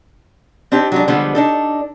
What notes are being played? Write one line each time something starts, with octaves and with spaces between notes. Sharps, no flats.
C4 D4 D#4 G4
F#3 G#3 D4
D3 F3 G3 G#3 B3 C4
D4 D#4 A4